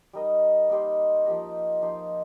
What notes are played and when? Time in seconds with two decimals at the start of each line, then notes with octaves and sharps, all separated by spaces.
0.13 G3 D#4 A#4 D#5
0.69 A#3 D#4 G4 C5
1.26 F3 A#3 G4 D#5
1.81 F3 D#4 G4 C5